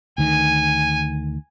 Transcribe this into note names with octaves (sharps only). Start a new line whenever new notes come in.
D2 D#3 G#5